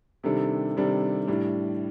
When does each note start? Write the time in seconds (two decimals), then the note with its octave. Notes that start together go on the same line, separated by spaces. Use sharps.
0.23 C3 D#3 G3 D4 A4
0.77 C3 D#3 G3 D4 A4
1.28 A2 G3 D4